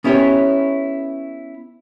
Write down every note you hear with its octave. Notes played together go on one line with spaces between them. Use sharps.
B3 C#4 E4 G4 C#5